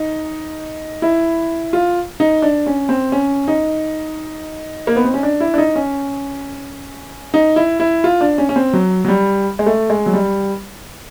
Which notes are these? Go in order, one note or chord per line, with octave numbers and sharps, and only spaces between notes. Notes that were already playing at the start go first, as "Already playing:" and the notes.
Already playing: D#4
E4
F4
D#4
D4
C#4
C4
C#4
D#4
A#3
B3
C4
C#4
D4
E4
D4
D#4
C#4
D#4
E4
E4
F4
D4
C#4
C#4
C4
F#3
F#3
G3
G#3
A3
G#3
F#3
G3